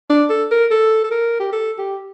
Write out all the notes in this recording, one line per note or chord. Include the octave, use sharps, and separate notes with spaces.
D4
A4
A#4
A4
A4
A#4
G4
A4
G4